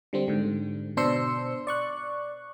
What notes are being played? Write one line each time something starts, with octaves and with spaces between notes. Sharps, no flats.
D3 G3 C4
G#2 D3
B2 D4 C5 C6 E6 C#7
D5 C#6 F#6